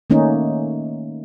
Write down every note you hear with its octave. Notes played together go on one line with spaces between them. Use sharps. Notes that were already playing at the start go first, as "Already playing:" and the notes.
D#3 A3 A#3 C#4 D#4